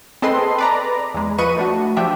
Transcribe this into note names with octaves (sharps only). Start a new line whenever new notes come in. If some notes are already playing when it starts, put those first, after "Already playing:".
C4 G#4 A4 B4 D#5 C6
B4 D5 A#5
E2 G#3
F3 B4 D#5 C#6 D#7
A3 D4 F#4
F3 D4 G4 E5